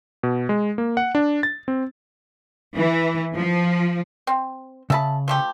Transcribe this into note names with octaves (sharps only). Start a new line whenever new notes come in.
B2
G#3
A#3
F#5
D4
A6
C4
E3
F3
C4
C#3 E5 A5 B5
F3 A3 G4